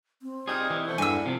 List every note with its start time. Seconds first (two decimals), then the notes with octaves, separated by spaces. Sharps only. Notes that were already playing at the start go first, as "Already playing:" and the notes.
0.22 C4
0.48 A#2 G3 D#4 G#4
0.70 E3
0.86 B2 A3 E4 C5
0.98 E2 G2 D3 G#5 E6
1.26 C3 F3